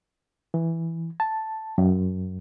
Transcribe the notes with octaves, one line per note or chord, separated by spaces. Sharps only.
E3
A5
F#2